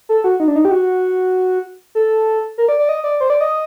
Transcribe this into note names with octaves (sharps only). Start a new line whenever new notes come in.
A4
F#4
D#4
D4
D#4
G4
F#4
A4
A#4
D5
D5
D#5
D5
C5
D5
D#5